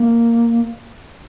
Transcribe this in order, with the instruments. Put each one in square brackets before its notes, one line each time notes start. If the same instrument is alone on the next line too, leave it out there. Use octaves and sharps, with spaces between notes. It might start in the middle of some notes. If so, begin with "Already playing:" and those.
Already playing: [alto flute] A#3